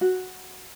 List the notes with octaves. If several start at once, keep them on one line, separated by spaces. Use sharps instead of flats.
F#4